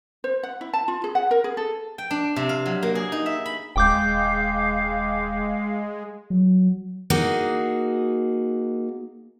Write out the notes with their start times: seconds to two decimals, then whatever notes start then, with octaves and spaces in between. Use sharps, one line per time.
0.24 C5
0.43 F#5
0.61 E4
0.73 A5
0.88 F4
1.04 G#4
1.15 F#5
1.31 A#4
1.44 G#4
1.57 A4
1.98 G5
2.11 D4
2.36 C3
2.49 F5
2.66 F#3
2.83 A#3
2.95 G#4
3.12 D#4
3.26 E5
3.46 B5
3.76 D#1 G#3 F5 G5 D6 G6
6.30 F#3
7.10 A#3 D#4 F#4 G#4